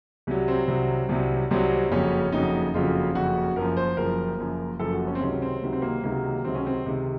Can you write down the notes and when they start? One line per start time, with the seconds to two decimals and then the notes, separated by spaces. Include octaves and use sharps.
0.27 C2 C3 F#3
0.48 C4
0.68 C2 C3 F#3
1.09 C2 C3 F#3
1.51 C2 C3 F#3 C4
1.91 F#1 F2 C#3 F#3 C#4
2.32 F#1 F2 C#3 F#3 D#4
2.74 F#1 F2 C#3 F#3 F4
3.14 F#1 F2 C#3 F#3 F#4
3.56 F#1 F#2 F3 A#4
3.77 C5
3.97 F#1 F#2 F3 A#4
4.38 F#1 F#2 F3
4.79 F#1 F#2 F3 A4
4.93 F#4
5.07 C#4
5.15 C4
5.21 C#2 C3 D#3 F#3 C#4
5.42 C4
5.62 C#2 C3 D#3 F#3
5.73 C4
5.82 A#3
6.03 C#2 C3 D#3 F#3 A#3
6.44 C#2 C3 D#3 F#3 C4
6.55 C#4
6.66 C4
6.86 C#2 C3 D#3